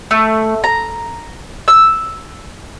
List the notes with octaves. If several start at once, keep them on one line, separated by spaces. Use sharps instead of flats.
A3
A#5
E6